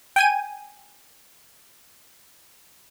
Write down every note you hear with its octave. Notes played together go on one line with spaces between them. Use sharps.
G5 G#5 D#7